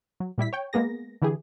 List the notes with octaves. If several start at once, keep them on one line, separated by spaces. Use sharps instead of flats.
F#3
A#2 G3 E4 B6
C#5 G5
G#3 A#3 B3 G#4 A#6
D3 E3 E4 G4 G#4